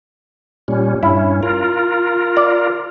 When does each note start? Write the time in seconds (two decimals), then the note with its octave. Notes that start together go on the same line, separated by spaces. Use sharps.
0.68 A#2 G3 C#4
1.03 G2 C#4 E4
1.43 F4 A#4
2.37 D5